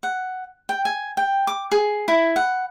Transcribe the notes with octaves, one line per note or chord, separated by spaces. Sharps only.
F#5
G5
G#5
G5
D6
G#4
E4
F#5